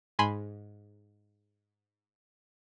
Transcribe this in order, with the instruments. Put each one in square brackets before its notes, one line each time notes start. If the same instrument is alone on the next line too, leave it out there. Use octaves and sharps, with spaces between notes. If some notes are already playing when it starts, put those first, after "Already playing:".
[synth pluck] G#2 G#5 B5 C6